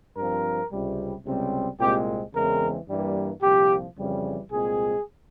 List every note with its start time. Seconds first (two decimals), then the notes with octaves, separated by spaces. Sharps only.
0.16 G2 F3 C4 A#4
0.71 C#2 C3 G3
1.25 C#2 C3 G3 C4
1.79 C2 A#2 G#3 C4 G4
2.33 E2 C#3 E3 G#3 C4 A#4
2.88 G2 E3 G3 A#3
3.42 C2 A#2 F3 G4
3.97 F2 C#3 E3 G3
4.51 C2 A#2 G#3 C4 G#4